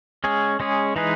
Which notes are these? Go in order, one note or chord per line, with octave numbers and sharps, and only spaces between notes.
G#3 C#4 G#4
G#3 C#4 G#4
E3 G#3 D#4 G#4 B4